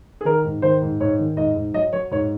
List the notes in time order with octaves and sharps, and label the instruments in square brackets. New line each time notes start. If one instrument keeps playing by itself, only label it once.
[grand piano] G#4
D#3 A#4
G#2
D#3 C5
G#2
G#2 C#5
D#3
G#2 D#5
G#2
F#3 D#5
F#3 C#5
G#2 C#5